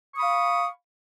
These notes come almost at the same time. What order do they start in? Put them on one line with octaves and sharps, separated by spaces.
C#6 D#6 B5 F5